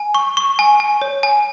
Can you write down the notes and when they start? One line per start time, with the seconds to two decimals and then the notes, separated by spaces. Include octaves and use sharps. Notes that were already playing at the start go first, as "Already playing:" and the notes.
Already playing: G#5
0.15 C#6
0.37 C#6
0.59 G#5
0.80 G#5
1.02 C#5
1.23 G#5